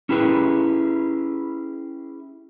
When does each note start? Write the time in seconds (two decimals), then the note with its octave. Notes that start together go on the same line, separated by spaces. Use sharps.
0.09 C#4 E4 G4 G#4 B4